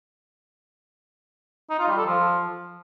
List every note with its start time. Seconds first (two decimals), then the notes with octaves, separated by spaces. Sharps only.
1.70 D#4
1.79 F4
1.88 G3
1.97 A4
2.06 F3